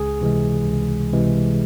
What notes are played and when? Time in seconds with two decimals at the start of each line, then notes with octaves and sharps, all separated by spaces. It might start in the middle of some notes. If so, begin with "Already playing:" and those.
Already playing: C#2 G#4
0.21 C3 E3 G#3
0.66 C#2
1.13 C3 E3 G#3